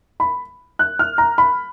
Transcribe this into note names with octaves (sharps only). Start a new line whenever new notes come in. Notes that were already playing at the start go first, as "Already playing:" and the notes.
B5
F#6
F6
A#5
B5